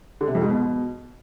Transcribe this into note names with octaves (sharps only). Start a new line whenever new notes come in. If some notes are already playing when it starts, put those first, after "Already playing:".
D3
C3
F2
G#2
B2